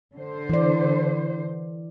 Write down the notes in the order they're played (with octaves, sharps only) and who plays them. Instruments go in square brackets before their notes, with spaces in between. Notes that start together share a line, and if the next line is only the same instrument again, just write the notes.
[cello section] D3 C5
[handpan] E3 D5